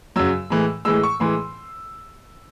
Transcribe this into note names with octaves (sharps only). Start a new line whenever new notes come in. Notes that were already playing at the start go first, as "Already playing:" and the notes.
F#2 C#3 F#3 E6
A2 E3 G#3
A2 E3 G#3 E6
C#6
A2 E3 G#3 C6